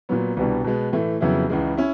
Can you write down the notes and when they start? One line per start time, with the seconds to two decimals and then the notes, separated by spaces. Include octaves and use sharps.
0.09 A#2 F#3 B3
0.37 C2 B2 G3 B3 D4
0.64 B2 G#3 B3
0.93 A2 E3 A3
1.21 F2 C#3 F#3 B3 E4
1.49 C#2 C#3 E3 G#3
1.77 C#4 E4